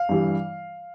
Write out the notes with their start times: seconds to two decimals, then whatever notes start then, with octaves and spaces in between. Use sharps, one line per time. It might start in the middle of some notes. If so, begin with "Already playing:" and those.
Already playing: F5
0.09 G2 E3 G3